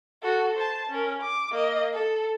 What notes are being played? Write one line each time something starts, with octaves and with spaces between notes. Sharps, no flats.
F#4 A4
C5 A5
C#4 A#4
D6
A#3 D#5
A4